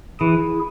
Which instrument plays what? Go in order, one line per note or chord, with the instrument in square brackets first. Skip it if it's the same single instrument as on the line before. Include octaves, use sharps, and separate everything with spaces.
[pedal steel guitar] E3 [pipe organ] E4 G#4